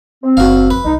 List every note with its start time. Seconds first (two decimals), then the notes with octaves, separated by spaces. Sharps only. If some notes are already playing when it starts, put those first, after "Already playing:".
0.23 C4
0.37 F#1 B3 F#4 F5
0.71 F2 B4
0.84 C2 D#4